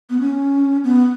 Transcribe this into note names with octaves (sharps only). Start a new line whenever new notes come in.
B3
C#4
B3